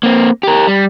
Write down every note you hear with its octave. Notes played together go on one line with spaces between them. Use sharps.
A#3 C4
G4 A#4
G3